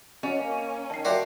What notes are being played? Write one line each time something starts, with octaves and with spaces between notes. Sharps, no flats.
F#3 C#4 D#5
A#3
D#3 A5 C7
A#2 F#4 G4 A#4 C5 D5 E5